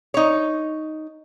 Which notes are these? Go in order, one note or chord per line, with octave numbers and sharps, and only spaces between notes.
D#4 C#5